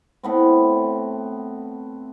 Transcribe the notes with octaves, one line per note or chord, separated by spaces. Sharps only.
A2 B3 C4